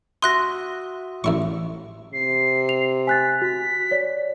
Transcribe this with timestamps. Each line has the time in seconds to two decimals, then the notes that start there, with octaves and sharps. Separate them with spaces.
0.22 F#4 E5 C6 D#6 F#6 A#6
1.24 A1 A2 E4 C#6
2.13 C3 C7
2.69 F7
3.07 G#5 F#6 A6 B6
3.42 F#4 B6
3.91 C#5 D5